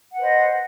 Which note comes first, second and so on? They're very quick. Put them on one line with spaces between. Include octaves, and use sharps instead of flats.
F#5 B4 C5 D#5